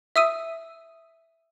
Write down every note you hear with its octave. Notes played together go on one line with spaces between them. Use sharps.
E5 D#6 E6 D#7